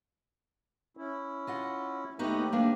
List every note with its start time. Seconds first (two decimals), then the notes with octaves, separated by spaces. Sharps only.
0.97 C#4 E4
1.47 F4 D#5 F#5
2.19 D#2 A3 B3 D#4 F#4 G4
2.52 A#3 B3 D4